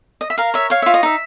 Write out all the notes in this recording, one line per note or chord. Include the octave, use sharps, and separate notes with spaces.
D#5
E5
A#4 F5
C#5 E5
C#5 F5
F4 E5
D#5
D#4 E5